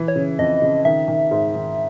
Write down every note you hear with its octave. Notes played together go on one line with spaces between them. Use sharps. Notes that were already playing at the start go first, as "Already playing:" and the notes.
Already playing: E3
C#5
C#3
F2 D#5
C#3
D#3 E5
D#3
G#2
D#3